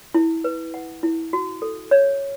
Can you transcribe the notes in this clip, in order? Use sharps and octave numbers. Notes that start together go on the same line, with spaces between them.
E4
B4
F#5
E4
F#4
A4
C#5